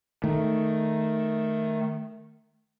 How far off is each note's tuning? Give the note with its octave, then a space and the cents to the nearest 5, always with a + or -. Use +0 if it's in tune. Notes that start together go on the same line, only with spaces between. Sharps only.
D#3 +0 A3 +0